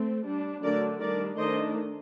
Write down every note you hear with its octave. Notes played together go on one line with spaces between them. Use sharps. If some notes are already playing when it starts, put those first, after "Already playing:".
Already playing: A3 C4
G3 D4
D3 F#3 A3 D4 A#4 D5
D#3 G3 D4 A#4 D5
D#3 A3 D4 C5 D#5